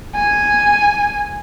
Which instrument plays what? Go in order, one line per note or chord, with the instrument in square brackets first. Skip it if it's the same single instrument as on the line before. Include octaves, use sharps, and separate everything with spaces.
[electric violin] G#5